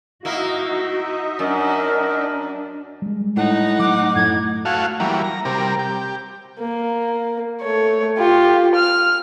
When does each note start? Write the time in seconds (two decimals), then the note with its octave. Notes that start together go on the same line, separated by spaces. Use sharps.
0.25 A#3 D#4 E4 F#4 D#5 E5
1.39 F#2 D4 A#4
3.02 G3 G#3
3.36 A2 D#4 F#5
3.79 F#3 D6
4.16 F#2 A2 F#3 G#6
4.65 A3 F#4 F5
5.00 E3 F#3 G3 A#3
5.24 A#5
5.45 C3 G3 A#4
5.79 G4
6.59 A#3
7.62 A3 C#5
8.18 F4 G4
8.75 F6